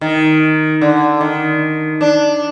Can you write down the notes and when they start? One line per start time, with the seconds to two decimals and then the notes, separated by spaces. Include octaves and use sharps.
0.01 D#3
0.81 D3
1.21 D#3
2.01 D4